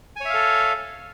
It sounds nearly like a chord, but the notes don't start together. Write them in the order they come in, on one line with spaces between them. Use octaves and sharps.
G#5 C#5 E5 F5 A4